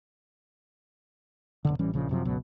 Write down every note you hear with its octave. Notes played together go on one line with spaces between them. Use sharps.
E1 F#2 D3
A1 E3 G3 C#4
A#1 C#3 F3
F#2 C3 F3
G1 C#2 B2 F#3